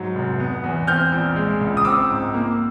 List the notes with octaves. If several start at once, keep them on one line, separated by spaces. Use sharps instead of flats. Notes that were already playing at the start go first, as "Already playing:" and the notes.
Already playing: G#2 F#3
F1
B3
E2
C4 F6 G6
A#1
G#3
C#2
D#6
C4 D6 E6
G#2
A#3